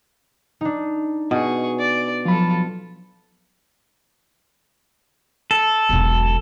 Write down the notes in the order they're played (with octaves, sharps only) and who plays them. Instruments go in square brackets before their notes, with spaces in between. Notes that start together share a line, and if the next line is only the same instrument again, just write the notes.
[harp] D4 D#4
[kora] B2 [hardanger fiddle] G#4 C#6
[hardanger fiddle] D5
[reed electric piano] F3 F#3 B5 [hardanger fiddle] F4 A4
[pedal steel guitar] A4
[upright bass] E1 B1